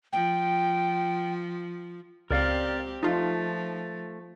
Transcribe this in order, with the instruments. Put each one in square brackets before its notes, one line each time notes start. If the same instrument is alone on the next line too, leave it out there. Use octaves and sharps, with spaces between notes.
[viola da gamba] F3 [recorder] G5
[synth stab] C#2 [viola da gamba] C4 G4 [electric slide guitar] A#4 D5 F5
[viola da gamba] F3 [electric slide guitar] A3 [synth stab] D#4 F4